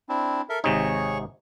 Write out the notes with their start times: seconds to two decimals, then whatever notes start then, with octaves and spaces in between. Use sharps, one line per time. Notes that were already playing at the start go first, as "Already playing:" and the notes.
0.09 C4 D4 E4
0.49 A4 A#4 E5
0.64 G#1 C3 D#4 G#4 C#5 C#6